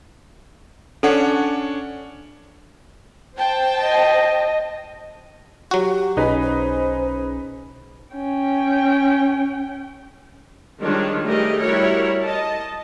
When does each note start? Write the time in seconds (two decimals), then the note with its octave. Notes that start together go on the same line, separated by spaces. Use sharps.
1.03 C#4 D4 A4 C#5 F#5
3.37 C5 G5 A5
3.82 D#5
5.71 F#3 F#4 G4
6.17 B1 C#4 D#4 G#4 B4 D#5 B5
6.42 C5
8.15 C#4 G5
10.81 D#3 F3 G3 G#3 D4 C#5
11.24 G3 A3 G4 G#4 A#4 D#5
11.60 G3 E4 F#4 A#4 C#5
12.24 D#5 A5